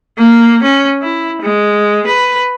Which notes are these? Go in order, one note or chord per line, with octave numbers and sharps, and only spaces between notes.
A#3
C#4
E4
G#3
B4